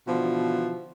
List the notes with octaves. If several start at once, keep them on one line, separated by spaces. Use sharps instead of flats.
B2 D3 E3 F3